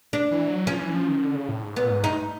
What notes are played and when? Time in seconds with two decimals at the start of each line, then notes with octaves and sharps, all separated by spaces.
0.13 D4
0.31 E3
0.48 F#3
0.67 F3 C#4
0.80 E3
0.94 F3
1.08 D#3
1.22 D3
1.35 C#3
1.49 A2
1.62 G#2
1.76 A#2 B3
1.90 G#2
2.03 G2 D#4